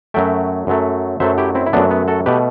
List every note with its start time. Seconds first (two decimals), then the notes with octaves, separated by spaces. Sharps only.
0.14 F#2 F#3 A3 E5 G5
0.67 F#2 F#3 A3
1.20 F#2 F#3 A3 C5 E5
1.38 E4 G4
1.55 C4 E4
1.66 E4
1.73 F#2 F#3 A3 B3 D4
1.91 B3
2.08 F#4 A4
2.26 B2 A3 G4 B4